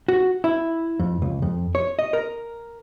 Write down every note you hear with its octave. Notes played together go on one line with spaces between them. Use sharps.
F#4
E4
F2
C#2
F2
C#5
D#5
A#4